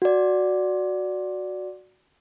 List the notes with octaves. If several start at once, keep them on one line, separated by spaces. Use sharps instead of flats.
F#4 D5